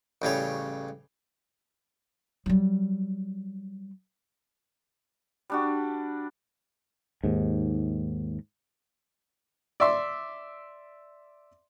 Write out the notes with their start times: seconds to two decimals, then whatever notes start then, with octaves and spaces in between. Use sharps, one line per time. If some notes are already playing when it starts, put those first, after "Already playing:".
0.22 A1 C#3 G3 C#5
2.46 F#3 G3
5.50 G3 D4 F#4
7.24 D#2 G#2
9.80 D5 E5 C6